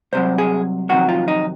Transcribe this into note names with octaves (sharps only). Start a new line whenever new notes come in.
C2 C3 F#3 C5
G#4
F2 C3 D#3 F#3 F#4
F4
D#4